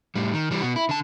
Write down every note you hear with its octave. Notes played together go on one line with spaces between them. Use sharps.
A2 G3
D#3
E3 G3
B2 F#4
E4
D3 A5